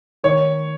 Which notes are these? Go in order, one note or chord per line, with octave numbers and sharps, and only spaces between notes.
D#3 C#5